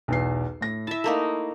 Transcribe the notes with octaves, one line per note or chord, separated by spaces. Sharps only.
B1 E2 C7
A2 A#6
E4 E5 A5
A3 A#3 D#4